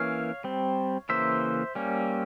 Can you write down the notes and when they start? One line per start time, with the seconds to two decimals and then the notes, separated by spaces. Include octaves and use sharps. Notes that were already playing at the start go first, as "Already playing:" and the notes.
Already playing: E3 A#3 C#4 C#5 F5
0.44 G3 C4
1.09 C#3 E3 A#3 C5 E5
1.75 G3 A#3 C#4